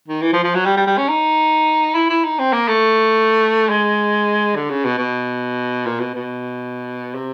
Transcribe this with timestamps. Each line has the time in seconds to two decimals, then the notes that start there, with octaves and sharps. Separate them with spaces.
0.08 D#3
0.22 E3
0.33 F3
0.44 F3
0.55 F#3
0.66 G3
0.77 G3
0.87 G3
0.98 C#4
1.09 D#4
1.95 E4
2.09 E4
2.24 D#4
2.39 C4
2.53 A#3
2.68 A3
3.69 G#3
4.56 D3
4.70 C#3
4.85 B2
4.98 B2
5.86 A#2
5.99 B2
6.14 B2
7.15 C3